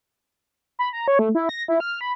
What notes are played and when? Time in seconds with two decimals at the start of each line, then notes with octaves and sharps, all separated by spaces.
0.79 B5
0.93 A#5
1.08 C#5
1.19 A3
1.35 E4
1.49 A#6
1.68 E4
1.80 F6
2.01 B5